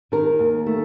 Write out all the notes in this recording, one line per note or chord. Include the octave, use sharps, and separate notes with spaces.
D#3 A#4
D#2
A3